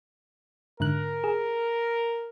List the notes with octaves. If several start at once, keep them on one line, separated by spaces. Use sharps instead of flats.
G#2 D3 A#4 F#6
G#4